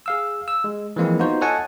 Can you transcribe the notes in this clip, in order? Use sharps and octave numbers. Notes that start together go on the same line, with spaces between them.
G#4 F5 E6
E6
G#3
E3 F3 G#3 A#3 C4 E4
B3 D#4 F4 F#4 C5
A4 C#5 D#5 F#5 G#5 A5